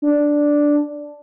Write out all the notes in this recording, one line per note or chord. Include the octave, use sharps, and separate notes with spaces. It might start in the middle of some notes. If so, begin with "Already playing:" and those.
D4